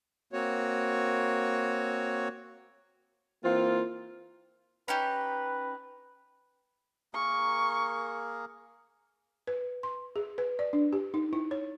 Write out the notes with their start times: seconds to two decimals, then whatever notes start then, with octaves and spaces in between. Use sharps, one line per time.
0.33 A#3 C4 F#4 C#5
3.43 E3 A#3 C4 F4
4.88 C#4 D#4 G4 B4
7.14 A#3 G#4 A#4 C#6
9.47 B4
9.83 C6
10.16 G#4
10.38 B4
10.59 D5
10.73 D4
10.93 G4
11.14 D#4
11.33 E4
11.51 C#5